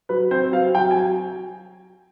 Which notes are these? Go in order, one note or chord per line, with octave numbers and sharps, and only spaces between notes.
F#3 B4
C4 C5
F#3 F5
F#3 G5
G#5
F#3